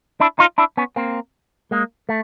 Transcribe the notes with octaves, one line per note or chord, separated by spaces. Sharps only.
D4 E4
D#4 F4
D4 E4
B3 C#4
A#3 C4
G#3 A#3
A3